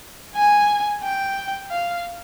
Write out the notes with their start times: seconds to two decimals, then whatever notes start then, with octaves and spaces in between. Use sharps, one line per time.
0.35 G#5
1.03 G5
1.71 F5